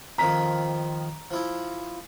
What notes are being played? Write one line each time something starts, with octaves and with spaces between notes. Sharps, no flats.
F2 D#3 F3 A#5 B6
F3 E4